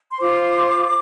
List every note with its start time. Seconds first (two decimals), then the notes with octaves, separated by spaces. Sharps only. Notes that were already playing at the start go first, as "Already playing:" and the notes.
0.08 C6
0.20 F4 C5 D6